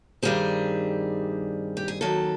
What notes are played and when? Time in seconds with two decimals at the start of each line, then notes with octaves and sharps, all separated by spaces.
0.23 G2 D#3 G3 C4 G#4
1.77 G4
1.88 G#4
2.01 D#2 D#3 F#3 A4